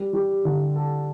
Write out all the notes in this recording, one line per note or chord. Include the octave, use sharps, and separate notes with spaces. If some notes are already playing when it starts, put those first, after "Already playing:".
Already playing: G3
G3
D3
A4